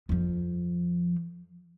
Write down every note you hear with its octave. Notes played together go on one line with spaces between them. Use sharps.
F2 F3